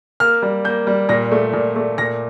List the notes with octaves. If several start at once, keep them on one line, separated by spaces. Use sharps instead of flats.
A#3 F6
G3
A#3 G6
G3
A#2 A#6
A3
A#2
A3
A#2 A#6